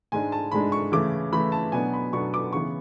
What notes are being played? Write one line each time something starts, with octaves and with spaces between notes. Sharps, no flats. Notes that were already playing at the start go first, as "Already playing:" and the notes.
G#2 G#3 D4 G#5
A5
G#2 G#3 D4 B5
C#6
C#3 E3 A3 D6
C#3 E3 A3 B5
A5
B2 F#3 B3 D4 G#5
B5
B2 F#3 B3 D4 C#6
D6
C#3 E3 B3 C#6